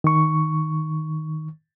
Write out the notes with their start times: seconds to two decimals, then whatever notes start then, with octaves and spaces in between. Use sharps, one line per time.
0.04 D#3 C#6